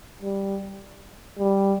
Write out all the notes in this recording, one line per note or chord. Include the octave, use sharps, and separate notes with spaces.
G3
G3